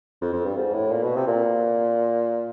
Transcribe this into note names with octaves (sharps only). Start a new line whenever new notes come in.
F2
F2
G2
G#2
A2
A#2
B2
C3
A#2